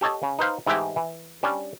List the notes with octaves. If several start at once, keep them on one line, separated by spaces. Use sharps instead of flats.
G4 A4 C#5 D#5 A5
C#3
D#4 B4 C5 F5
G#2 E3 G#3 A3 E4 G4
E3
G3 C#4 D4